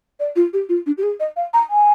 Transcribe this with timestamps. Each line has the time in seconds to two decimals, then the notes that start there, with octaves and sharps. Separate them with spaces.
0.20 D5
0.36 F4
0.53 G4
0.69 F4
0.86 D4
0.98 G4
1.03 G#4
1.20 D#5
1.36 F5
1.54 A#5
1.70 G#5